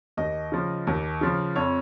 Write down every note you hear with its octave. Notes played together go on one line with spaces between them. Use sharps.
D#2 D#5
C#3 F3
D#2
C#3 F3
F2 C#5